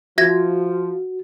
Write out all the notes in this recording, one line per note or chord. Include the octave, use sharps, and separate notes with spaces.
F3 F#4 E5 G#6 A#6